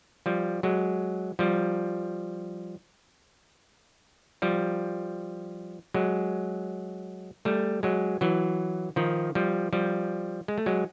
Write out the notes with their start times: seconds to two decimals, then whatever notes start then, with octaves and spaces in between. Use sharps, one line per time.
0.26 F3 G3
0.63 F#3 G#3
1.39 F3 G3
4.42 F3 G3
5.94 F#3 G#3
7.45 G3 A3
7.83 F#3 G#3
8.21 E3 F#3
8.96 D#3 F3
9.35 F3 G3
9.73 F3 G3
10.48 G#3
10.58 A3
10.66 F#3 G#3